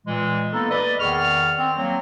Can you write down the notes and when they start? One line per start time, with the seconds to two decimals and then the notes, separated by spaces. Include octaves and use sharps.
0.07 A#2 E3 G#3
0.53 A#3 B3 D#4 A4
0.71 B4 D5 D#5
1.00 E2 D#3 G#4 D5 C#6 F6
1.58 C4
1.77 F#3 A#3 C4